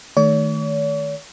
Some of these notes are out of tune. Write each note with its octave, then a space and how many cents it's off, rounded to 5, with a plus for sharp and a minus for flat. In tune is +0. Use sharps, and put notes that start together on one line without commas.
D#3 +0 A3 +0 C#5 +45